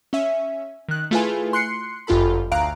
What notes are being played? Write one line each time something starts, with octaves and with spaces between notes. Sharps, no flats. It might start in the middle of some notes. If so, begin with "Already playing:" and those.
C#4 E5
D#3 F#6
A3 E4 F4 G#4 B4 G#5
C6 F#6 C7 C#7
G1 F#2 F4 G4 A4 B5
D2 F5 A#5 F#6 D7